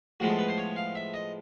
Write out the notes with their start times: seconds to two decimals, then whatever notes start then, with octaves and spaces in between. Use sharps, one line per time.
0.20 A2 F3 G#3 B3 F#4
0.30 A4
0.39 B4
0.48 C5
0.58 C#5
0.76 F5
0.95 E5
1.14 D#5